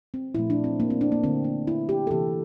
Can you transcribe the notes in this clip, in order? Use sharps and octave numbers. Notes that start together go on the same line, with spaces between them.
C4
A#2 F3 A3 E4
D4
C4
A#3
C4
D4
A#3
D3 A3 C4
D4
E4
G4
A4
C3 E3 A#3 G4